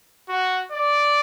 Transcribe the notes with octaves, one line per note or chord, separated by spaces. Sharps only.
F#4
D5